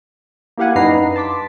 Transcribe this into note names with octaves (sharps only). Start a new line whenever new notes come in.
A#3 E4 G4 F5 F#5 G#5
F#2 D4 D#4 B4 A#5 C7
A5 C6 D6 B6